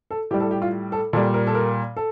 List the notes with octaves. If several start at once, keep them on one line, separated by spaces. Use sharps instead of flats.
A4
A2 G3 G4
A4
G4
F4
A4
A#2 G3 A4
A#4
A4
A#4
A4